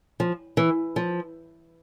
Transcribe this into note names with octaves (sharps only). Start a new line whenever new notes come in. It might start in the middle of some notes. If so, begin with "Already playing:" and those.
F3
E3
F3